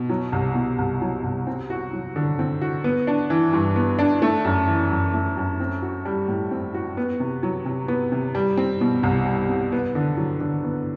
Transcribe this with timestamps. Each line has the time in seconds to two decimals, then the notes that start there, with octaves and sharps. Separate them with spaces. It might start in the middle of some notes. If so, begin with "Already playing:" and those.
Already playing: B2
0.09 F#3
0.32 C2
0.55 B2
0.78 C2
1.02 F#3
1.24 C2
1.47 C4
1.70 F#4
1.93 F#3
2.16 D3
2.39 C4
2.61 F#4
2.84 B3
3.07 D4
3.30 E3
3.53 G2
3.76 B3
3.99 D4
4.22 A3
4.45 F#2
4.68 E3
4.91 F#2
5.14 A3
5.37 F#2
5.60 C4
5.82 F#4
6.05 G3
6.28 A2
6.51 C4
6.74 F#4
6.97 B3
7.20 C3
7.43 F#3
7.65 C3
7.88 B3
8.12 C3
8.35 G3
8.57 C4
8.81 B2
9.03 C2
9.26 G3
9.49 C4
9.72 B3
9.95 D3
10.17 F#3
10.40 D3
10.64 B3